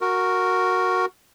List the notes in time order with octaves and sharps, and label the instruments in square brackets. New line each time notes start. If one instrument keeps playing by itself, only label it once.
[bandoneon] F#4 A#4